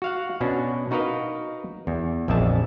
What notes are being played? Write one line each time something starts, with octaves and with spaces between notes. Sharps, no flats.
F#4 F5 F#5
B2 C#4 D4 F#4
D#4 F#4 A#4 B4 D#5 F5
E2
A#1 F2 G#4 E5 A5